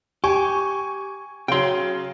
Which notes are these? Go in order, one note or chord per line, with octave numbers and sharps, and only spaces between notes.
G4 G#5 C#6
C#3 F#3 G5 C6